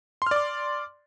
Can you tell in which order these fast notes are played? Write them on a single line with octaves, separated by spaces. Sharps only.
C6 F6 D5 D6